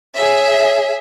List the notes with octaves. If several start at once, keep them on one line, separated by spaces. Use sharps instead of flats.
G#4 C#5 E5